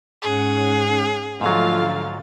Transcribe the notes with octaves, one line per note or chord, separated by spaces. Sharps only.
G#2 C#4 G#4 F#5
G#2 D3 F3 F#3 A3 F4 F5 A6